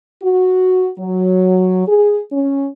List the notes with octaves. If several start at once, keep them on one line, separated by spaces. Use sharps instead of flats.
F#4
F#3
G#4
C#4